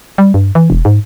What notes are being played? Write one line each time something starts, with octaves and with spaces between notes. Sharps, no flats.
G3
G2
E3
E1
G#2